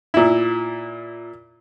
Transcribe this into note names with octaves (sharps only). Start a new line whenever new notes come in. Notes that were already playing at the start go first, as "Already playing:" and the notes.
A#2 E4